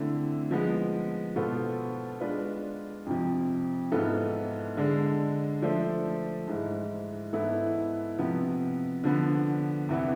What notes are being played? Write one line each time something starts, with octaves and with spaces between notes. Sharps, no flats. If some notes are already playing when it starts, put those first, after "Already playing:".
Already playing: D3 A3 C4 E4
F3 G#3 B3
B2 B3 F4 A4 C5
G#3 D4 F4 B4
F2 C3 F3
G#2 E3 B3 F4 A4
D3 G#3 D4 A4
F3 A3 D4 A4 C5
G#2 E3 G#3
G#2 E3 B3 E4 A4
C3 F3 B3
D3 F3 B3
E2 C3 E3 B3 E4